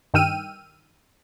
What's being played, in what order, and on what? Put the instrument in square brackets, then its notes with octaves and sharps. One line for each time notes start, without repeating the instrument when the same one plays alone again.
[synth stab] G2 D#3 G5 E6 F6 D#7